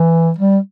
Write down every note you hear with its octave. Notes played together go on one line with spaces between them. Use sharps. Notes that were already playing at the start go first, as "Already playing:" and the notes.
Already playing: E3
G3